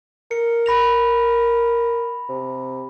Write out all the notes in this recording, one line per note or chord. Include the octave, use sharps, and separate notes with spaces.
A#4 C#7
B5 A#6 F7
C3